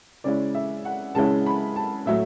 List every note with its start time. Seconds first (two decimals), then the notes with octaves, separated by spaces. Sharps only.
0.24 C#3 G#3 C#4 E4 D5
0.55 E5
0.85 F#5
1.15 C#3 G#3 C#4 E4 A5
1.46 B5
1.76 A5
2.06 A2 F#3 A3 E5